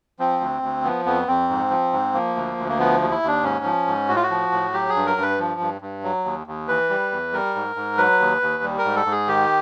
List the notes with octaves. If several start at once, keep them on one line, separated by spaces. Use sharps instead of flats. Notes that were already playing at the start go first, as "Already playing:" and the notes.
F3 C4
D2
D2
F3 B3
F2 B3
F2 C4
G#2
F3
G#2
F3 A#3
D2
D2
A#3
F3 B3
D#2
E4
D#2 D4
G#2 C#4
F3
G#2
A2 F#4
F4
F#4
F3
A2
F#3 G4
G#4
G2
A#4
G2
B4
F3
G2
G2
F#3
D#2
D#2
E3 B4
G3
E2
G3 A#4
G#2
G#2
F#3 B4
D#2
D#2
G3
A#4
G#2
A4
G#2
G#4
D#3 G4